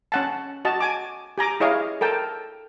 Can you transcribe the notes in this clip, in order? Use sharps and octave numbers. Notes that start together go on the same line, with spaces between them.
C#4 F#5 A5
F#4 D#5 A5
G#5 D6
G4 G#5 A#5 D6
E4 G#4 C#5 D#5 F5
A4 A#4 G5 A5